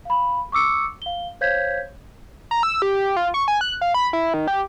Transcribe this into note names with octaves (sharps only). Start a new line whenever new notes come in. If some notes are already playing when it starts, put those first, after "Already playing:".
F5 B5
C#6 D6 E6 C#7
F5 G7
C5 C#5 F5 G6 G#6 B6
A#5
E6
G4
F4
C#6
G#5
F#6
F5
B5
E4
D#3
G4